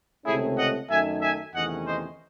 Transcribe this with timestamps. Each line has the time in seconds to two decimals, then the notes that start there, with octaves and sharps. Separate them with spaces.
0.24 C#2 C3 D#3 A3 C#4 E4 G#4
0.57 D#5 F#5
0.89 F#2 D#3 A3 D#4 E5 G#5
1.21 E5 G#5
1.54 E2 C3 D#3 A3 C#4 D#5 F#5
1.87 C5 D#5